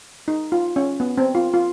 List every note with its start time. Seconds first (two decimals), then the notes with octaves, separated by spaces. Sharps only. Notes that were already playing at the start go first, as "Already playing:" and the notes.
0.28 D#4
0.52 F4
0.76 C#4
1.00 B3
1.18 C4
1.35 F4
1.54 F4